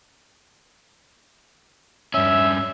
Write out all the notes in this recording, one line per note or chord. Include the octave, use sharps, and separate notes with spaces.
G2 C#4 E5